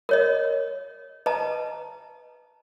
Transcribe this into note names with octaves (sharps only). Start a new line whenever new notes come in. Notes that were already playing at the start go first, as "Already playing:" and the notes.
A#4 C#5 D#5
B4 D#5 A5 A#5